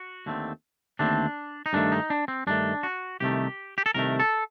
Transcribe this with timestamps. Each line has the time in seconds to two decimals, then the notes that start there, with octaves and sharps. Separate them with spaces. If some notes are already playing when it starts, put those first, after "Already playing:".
Already playing: F#4
0.26 D#2 D3 A3 C4
0.99 D#2 D3 A3 C4 D4
1.66 D#4
1.73 G2 D#3 A3 D4
1.92 D#4
2.10 D4
2.28 C4
2.47 G2 D#3 A3 D4
2.83 F#4
3.20 C2 C3 D#3 A3 G4
3.78 G4
3.86 A4
3.94 C2 C3 D#3 A3 A#4
4.20 A4